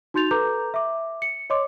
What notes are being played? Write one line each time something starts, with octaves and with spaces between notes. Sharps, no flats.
D#4 F#4 C6 G6 A6 F7
A4 B4 A#5 D6 G6
E5 D6
C#7
C#5 D#5 C6 D6